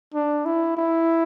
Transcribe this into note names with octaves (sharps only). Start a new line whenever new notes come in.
D4
E4
E4